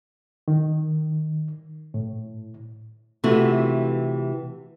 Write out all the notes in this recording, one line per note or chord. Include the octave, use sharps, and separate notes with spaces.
D#3
A2
C3 E3 A3 F4 F#4